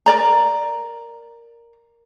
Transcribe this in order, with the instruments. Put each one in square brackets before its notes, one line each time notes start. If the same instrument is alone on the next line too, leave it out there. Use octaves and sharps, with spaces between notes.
[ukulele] A#4 D5 A#5